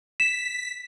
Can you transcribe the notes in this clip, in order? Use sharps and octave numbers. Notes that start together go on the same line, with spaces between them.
B6 E7